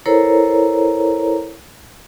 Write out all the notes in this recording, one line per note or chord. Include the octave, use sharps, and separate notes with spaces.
E4 A4 A#4 C5 C#5 A#5